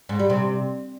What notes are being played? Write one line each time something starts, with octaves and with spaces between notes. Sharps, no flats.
G#2
G3
C3